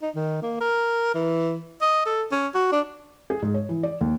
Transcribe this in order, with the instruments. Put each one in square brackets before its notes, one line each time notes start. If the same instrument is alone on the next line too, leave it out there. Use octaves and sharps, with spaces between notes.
[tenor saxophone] D#4
D#3
A#3
A#4
E3
D#5
A4
C#4
F#4
D4
[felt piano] G#4
G#2
C#5
E3
D5
D#2